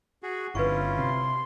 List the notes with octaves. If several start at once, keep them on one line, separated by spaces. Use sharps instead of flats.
F#4 G#4
G1 D3 C#4 E4 F4 B4 C#6
C3 C6